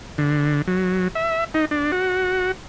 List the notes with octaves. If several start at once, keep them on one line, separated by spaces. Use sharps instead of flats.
D3
F#3
E5
D#4
D4
F#4